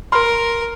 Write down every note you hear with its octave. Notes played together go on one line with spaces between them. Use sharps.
A#4 C6 F6